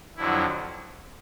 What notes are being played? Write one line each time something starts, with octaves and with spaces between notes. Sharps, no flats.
F2 D3 F#3 E4